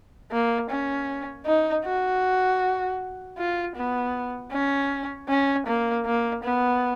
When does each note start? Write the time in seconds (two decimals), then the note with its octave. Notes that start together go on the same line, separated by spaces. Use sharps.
0.31 A#3
0.70 C#4
1.46 D#4
1.84 F#4
3.37 F4
3.76 B3
4.52 C#4
5.29 C#4
5.67 A#3
6.05 A#3
6.43 B3